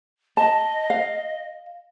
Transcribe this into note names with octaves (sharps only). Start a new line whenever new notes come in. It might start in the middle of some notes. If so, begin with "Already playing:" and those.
D#5 A5
F5